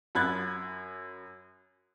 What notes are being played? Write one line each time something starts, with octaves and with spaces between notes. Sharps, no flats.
F#2 B5 F#6 G#6 A6